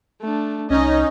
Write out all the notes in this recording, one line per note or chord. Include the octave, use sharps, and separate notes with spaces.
A3 D4
C2 C#4 D#4 D#5